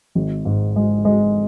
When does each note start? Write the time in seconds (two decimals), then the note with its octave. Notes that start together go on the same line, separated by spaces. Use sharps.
0.15 G#1
0.45 G#2
0.76 G#3
1.05 G#3